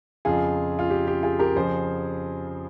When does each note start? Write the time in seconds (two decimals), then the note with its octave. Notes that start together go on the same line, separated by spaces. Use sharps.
0.25 F2 C#3 F3 F4 G#4
0.79 F4
0.90 G4
1.07 G4
1.23 F4 G#4
1.39 G4 A#4
1.56 F2 C#3 F3 G#4 C5